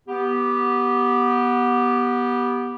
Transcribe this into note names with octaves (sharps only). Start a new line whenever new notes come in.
B3 G4